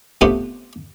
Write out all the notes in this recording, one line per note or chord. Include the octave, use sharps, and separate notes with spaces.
C3 A3 B3 D4 F4 C5